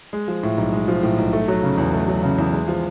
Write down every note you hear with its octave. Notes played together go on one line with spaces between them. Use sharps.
G#3
F3
A2
B1
G#3
F3
A2
B1
A3
F#3
C#3
E2
A3
F#3
C#3
E2
G#3
F3